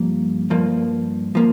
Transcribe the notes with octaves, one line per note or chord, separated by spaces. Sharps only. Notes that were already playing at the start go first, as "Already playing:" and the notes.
Already playing: G2 F3 A#3
G2 F3 A#3
F3 A#3